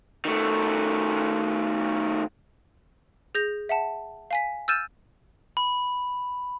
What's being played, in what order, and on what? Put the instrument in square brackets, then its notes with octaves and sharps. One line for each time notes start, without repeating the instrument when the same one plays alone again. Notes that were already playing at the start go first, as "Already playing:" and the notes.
[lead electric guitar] D#3 A3
[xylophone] G#4 G6 A#6
E5 F#5 A5
F5 G#5 B6
E6 F6 G6 A6 D#7 E7
[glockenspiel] B5